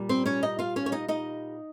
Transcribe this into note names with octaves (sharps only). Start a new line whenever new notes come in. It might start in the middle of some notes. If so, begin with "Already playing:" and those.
Already playing: A#2 G3
C4 C5
C#4 C#5
D#4 D#5
F4 F5
C#4 C#5
C#5
D#4 D#5
D#4 D#5